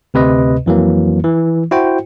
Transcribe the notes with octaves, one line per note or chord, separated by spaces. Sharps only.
D2 C3 B4 D#5
F2 E3 F#3 A#3
E3
E4 F#4 C5 G5